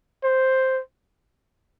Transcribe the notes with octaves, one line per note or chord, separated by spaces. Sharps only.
C5